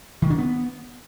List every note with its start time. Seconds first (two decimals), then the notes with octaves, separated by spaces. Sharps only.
0.22 D#3
0.30 D4
0.38 B3